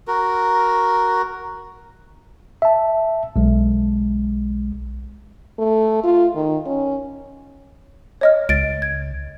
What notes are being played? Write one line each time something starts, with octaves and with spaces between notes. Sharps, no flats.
F#4 A#4
E5 A5
B1 G#3
A3
F4
D#3
C#4
C#5 D#5 F6
C#2 A6 D7
G#6